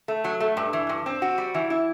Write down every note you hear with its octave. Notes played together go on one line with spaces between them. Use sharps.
A3
F#3
A3
G2
E3
G2
C4
F#4
G3
E3
E4